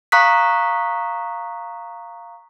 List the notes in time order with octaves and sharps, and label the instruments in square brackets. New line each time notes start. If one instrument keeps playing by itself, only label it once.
[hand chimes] F5 A#5 C#6 D#6 F#6 B6